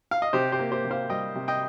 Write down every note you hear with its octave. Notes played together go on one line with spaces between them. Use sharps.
F5
D#5
C3 G4 C5
G4 C5
A#3
G4 C5
C3
C5 F5
G3 D#5 G5
C3
D#5 G5